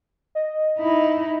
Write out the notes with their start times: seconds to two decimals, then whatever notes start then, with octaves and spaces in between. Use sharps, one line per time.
0.35 D#5
0.79 D#4 E4